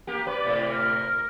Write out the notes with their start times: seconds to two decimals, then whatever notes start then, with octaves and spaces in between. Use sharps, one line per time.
0.07 A#3 G4
0.27 B4 D5
0.45 A2 C3
0.69 A#4